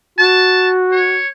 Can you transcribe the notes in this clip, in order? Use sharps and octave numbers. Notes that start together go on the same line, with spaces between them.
F#4 A5
C#5